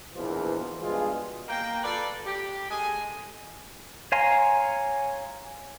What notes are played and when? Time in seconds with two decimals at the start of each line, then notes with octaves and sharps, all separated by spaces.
0.14 A#1 E2 B2 E3 F3
0.82 G2 B2 G#3 F4 G#4
1.48 A#3 G5
1.83 F4 A4 B4 D5
2.26 G4
2.70 G#3 A4 D#5 G#5
4.12 C#5 F5 G#5 A#5 C6